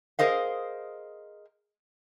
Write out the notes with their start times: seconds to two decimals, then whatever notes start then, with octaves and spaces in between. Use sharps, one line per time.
0.19 G#4 A#4 C5 D#5 F5